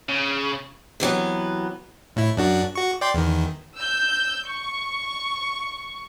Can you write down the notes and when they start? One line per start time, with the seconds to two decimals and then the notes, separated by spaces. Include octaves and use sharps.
0.09 C#3
1.00 C3 E3 F#3 B3
2.16 A2 E4
2.37 F#2 D4 F#4
2.75 F#4 C#6
3.01 D5 G5 C6
3.14 E2 D#3
3.76 E6 G6
4.48 C#6